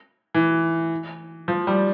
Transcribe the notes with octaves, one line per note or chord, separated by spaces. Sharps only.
E3
F3
G3